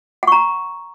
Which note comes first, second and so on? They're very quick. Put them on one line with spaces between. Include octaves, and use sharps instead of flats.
F#5 C#6 A#5